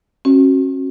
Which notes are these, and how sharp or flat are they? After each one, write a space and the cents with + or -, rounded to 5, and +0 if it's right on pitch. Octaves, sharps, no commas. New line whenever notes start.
C#4 -40 F#4 +0